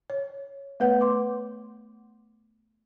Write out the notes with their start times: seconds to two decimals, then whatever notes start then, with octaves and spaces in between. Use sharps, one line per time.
0.10 C#5
0.80 A3 B3 B4 C#5 F#5
1.01 C6 D6